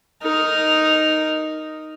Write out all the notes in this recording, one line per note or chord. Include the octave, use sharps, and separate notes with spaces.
D#4 A#4